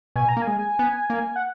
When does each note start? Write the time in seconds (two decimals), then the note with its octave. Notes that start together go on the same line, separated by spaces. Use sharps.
0.16 B2 G#5
0.29 A#5
0.37 A#3
0.42 G#5
0.47 G#3
0.79 B3
1.10 A#3
1.36 F#5